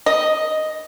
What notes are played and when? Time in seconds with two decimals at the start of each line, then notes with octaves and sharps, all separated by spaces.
0.06 D#5